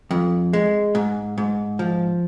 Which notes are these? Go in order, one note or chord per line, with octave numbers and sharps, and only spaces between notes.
F2
G#3
G#2
G#2
F3